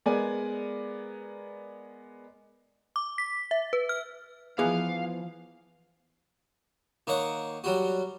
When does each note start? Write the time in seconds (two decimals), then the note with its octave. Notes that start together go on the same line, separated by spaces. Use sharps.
0.06 G#3 B3 A#4 D5 G#5
2.96 D6
3.18 B6
3.51 E5
3.73 B4
3.89 F6
4.59 E3 F3 B3 G#4 F5
7.07 D#3 A#3 C#5 F#5
7.64 F#3 G3 F#4